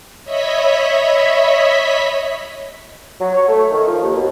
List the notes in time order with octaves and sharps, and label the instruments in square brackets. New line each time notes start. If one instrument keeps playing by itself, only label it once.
[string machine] C#5 D#5 E5 B5 B6
[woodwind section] F#3
C#5
A3
D#3
F3
D#2
B2